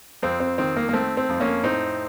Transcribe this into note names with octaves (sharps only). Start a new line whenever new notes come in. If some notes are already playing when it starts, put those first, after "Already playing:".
F2 C4
C4
D#3 C4
A#3
A#3
A3 C4
C4
F2
A#3 C#4
A2 C4 D#4